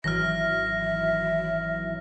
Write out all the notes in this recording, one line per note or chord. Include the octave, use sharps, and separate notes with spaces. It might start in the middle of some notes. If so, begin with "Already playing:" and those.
G#1 E3 F#3 E5 F6 A#6